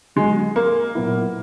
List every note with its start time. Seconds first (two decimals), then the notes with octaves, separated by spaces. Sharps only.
0.16 F#3 G#3 B3 F#4
0.56 A#3
0.95 A#2 F#3 B3 E4